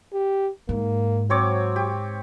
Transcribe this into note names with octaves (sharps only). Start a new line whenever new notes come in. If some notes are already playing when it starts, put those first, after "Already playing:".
G4
G#2 A#3
F#3 C4 C#5 D6
G4